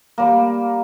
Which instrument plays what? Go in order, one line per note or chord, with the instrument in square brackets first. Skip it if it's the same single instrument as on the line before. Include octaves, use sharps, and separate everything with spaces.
[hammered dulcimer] G3 A#3